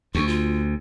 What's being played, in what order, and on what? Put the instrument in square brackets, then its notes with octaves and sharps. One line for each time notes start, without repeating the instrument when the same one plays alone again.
[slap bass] D2 [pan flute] C#6
[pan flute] F4